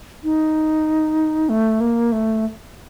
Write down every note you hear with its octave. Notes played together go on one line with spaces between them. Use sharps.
D#4
A3
A#3
A3